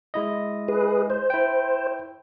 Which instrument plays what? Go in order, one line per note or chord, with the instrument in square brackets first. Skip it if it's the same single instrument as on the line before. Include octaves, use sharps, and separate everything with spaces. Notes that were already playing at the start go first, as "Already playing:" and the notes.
[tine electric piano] G#3 E4 D#5
[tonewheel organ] G#4 B4
C5
[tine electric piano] E4 G5